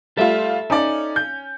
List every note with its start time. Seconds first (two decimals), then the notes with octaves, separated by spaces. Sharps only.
0.17 G3 A3 F4 A4 E5
0.70 C#4 D#4 D5
1.16 G6